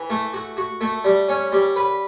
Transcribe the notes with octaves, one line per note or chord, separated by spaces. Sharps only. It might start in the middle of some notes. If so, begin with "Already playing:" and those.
Already playing: E3
A3
F#4
F#4
A3
G3
C#4
G3
B4